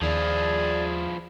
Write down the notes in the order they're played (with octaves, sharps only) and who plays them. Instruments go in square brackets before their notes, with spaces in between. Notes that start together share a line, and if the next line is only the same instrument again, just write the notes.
[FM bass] D#2 [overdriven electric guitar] F3 E4 [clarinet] G#4 [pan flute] D5